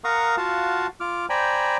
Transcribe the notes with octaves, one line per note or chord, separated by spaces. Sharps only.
A#4 F5 F#5 A#5 C#6 D#6
F4 F#4 F5 F#5 A5
F4 D6 F6
C5 D5 G5 G#5 A#5 B5